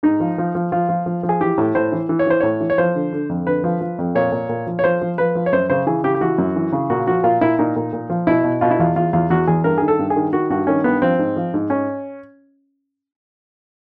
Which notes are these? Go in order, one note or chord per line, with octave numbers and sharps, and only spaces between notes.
G#2 D#4
F3
F3
F3
F3 F4
F3
F3
F3
G#4
E3 G4
A2
A2 C5
E3
E3
C#5
E3 C5
A2 C#5
E3
C#5
F3 C5
D3
D3
F2
D3 B4
F3
F3
F2
A#2 C#5
A#2
A#2
F3
C#5
F3 C5
F3
F3 B4
F3
C#5
F#2 C5
C#3 C5
E3 G#4
C#3 G4
G4
E3 F#4
F#2
E3
C#3
A#2 F#4
F3 F#4
A#2 F4
A#2 E4
A#2 D#4
A#2
A#2
F3
B2 E4
B2
B2 F4
E4
E2 F4
E2 F4
E2 F4
E2 F#4
E2 G#4
G2 A#4
D#3 G#4
A4
G2
G#4
D#3
D#3 F#4
G2 F#4
D#3 C#4
G2 B3
F3 C4
G#2
F3
G#2
G#2 C#4